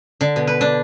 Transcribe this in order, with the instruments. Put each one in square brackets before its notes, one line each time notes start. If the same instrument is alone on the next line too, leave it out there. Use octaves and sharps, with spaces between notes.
[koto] D3
B2
B4
D4